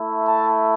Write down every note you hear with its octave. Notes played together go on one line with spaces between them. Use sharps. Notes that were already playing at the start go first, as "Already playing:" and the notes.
Already playing: A3 E4
A5